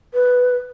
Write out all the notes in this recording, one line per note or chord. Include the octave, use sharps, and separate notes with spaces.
B4